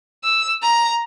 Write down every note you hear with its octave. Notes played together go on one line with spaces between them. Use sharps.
E6
A#5